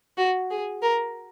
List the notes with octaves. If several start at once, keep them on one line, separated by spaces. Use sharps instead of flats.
F#4
G#4
A#4